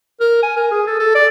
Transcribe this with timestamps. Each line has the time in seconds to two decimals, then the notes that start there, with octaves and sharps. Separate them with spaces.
0.20 A#4
0.43 G#5
0.56 A#4
0.71 G#4
0.87 A4
0.99 A4
1.15 D5